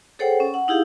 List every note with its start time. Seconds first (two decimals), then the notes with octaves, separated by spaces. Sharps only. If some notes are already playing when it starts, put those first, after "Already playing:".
0.19 G#4 A4 C5 C#5 F#5 G5
0.40 C#4
0.54 F#5
0.68 D#4 E4 G4 G#4 F5